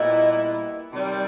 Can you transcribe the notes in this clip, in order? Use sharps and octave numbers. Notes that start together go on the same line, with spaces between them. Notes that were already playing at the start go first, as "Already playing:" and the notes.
Already playing: A#2 G3 B3 E4 D#5
C3 D#3 G3